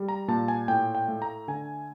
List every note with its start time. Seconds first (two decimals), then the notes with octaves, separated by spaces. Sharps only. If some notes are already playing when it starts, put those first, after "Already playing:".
Already playing: G3
0.08 A#5
0.28 A#2 A5
0.48 G#5
0.68 A2 G5
0.95 G5
1.08 A3
1.22 A#5
1.48 D3 G#5